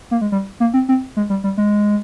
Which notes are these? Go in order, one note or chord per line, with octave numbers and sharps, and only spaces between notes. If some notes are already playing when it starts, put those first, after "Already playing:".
A#3
G#3
G3
A#3
C4
C4
G#3
G3
G3
G#3